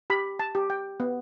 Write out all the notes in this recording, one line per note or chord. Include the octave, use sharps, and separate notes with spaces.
G4 B5
A5
G4
G5
B3